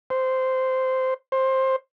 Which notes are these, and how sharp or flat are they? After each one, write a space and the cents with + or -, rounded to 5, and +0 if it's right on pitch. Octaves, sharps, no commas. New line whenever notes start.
C5 -10
C5 +15